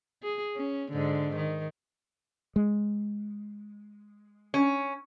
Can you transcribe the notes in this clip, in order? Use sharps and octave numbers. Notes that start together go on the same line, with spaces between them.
G#4
C#4
G#2 D3
D#3
G#3
C#4